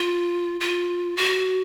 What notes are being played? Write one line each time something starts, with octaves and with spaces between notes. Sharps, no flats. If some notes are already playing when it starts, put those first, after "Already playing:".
Already playing: F4
F4
F#4